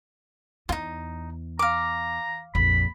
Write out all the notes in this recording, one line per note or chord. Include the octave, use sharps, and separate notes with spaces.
E2 D#4 F4
F5 A#5 D6
A#1 F2 B5